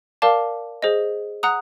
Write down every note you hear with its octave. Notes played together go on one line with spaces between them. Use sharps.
A#4 D5 F5 A5 D6
G#4 C5 D#5
F#5 A#5 D#6 F#6